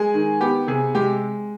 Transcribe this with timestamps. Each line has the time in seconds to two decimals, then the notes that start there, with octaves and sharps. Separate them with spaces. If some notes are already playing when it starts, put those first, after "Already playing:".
Already playing: G#3 G#4
0.14 D#3
0.40 B3 G4
0.68 C3 G#4
0.95 G#3 G4